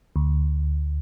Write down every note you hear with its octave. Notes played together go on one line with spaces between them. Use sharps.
D2